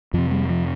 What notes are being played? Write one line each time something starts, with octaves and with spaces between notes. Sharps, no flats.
F2 C3 F3
G3
F3